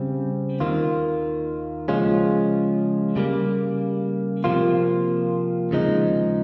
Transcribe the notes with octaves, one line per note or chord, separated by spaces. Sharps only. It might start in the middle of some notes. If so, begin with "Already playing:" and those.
Already playing: C#3 G3 C4
D#2 D#3 A#3 F4
C#3 F3 G#3 C#4 F4
C#3 G3 A#3
C3 F3 A#3 F4
D#2 C#3 F3 G#3 D#4